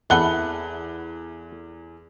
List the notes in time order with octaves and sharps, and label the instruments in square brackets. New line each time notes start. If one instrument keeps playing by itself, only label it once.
[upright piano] E2 F#6 G7 [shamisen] E3 F#5 G#5 [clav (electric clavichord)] E4 A4